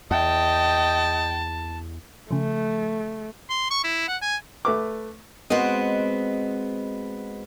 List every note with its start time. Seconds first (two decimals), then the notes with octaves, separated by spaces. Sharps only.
0.11 E2 D#5 G5 A5
2.31 C#3 F3 A3
3.50 C6
3.71 C#6
3.84 E4
4.08 F#5
4.22 G#5
4.65 A3 B4 D6
5.50 G#3 B3 C4 F#4 D#5